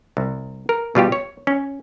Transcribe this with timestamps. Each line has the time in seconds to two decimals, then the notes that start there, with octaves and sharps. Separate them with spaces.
0.17 C2
0.69 A#4
0.95 B2 G3 F4 G4
1.12 C#5
1.47 C#4